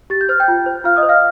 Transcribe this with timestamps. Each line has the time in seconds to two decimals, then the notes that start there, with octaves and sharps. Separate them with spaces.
0.10 G4 A6
0.21 G6
0.29 C5 F6
0.40 G5 G6
0.48 F4
0.66 C5
0.84 F4 F5 F6
0.97 D#5 D#6
1.03 C5
1.09 F5 F6